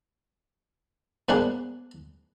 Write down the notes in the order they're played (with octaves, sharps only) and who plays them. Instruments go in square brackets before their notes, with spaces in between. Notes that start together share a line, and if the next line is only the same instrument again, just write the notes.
[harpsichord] G#2 A#3 B3 D4 G#4